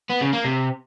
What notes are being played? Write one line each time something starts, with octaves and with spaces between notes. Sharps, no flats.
B3
C#3
A#3
C3